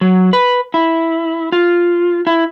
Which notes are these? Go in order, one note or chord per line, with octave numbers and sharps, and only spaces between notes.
F#3
B4
E4
F4
E4